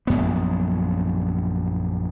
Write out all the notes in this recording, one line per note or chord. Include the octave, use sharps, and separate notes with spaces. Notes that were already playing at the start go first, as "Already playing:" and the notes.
A#1 F#2 B3